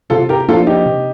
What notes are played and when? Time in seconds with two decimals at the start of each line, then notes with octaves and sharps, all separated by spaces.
0.10 C3 F4 A4
0.29 G4 A#4
0.48 F3 A#3 D4 F4 A4
0.67 D#4 G4
0.85 C3